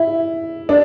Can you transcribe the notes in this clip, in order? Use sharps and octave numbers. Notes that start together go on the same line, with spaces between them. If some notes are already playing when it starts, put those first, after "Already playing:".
Already playing: E4
D4